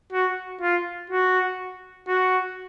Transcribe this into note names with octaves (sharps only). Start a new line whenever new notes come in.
F#4
F4
F#4
F#4